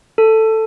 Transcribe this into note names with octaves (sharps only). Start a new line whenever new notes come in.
A4